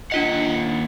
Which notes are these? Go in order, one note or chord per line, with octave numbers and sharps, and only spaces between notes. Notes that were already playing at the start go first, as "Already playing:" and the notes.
D#2 D4 F4 D#5 F#5